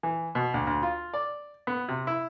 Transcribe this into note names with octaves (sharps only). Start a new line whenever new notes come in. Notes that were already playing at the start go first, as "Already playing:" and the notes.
E3
B2
D2
D2
F4
D5
B3
C3
E4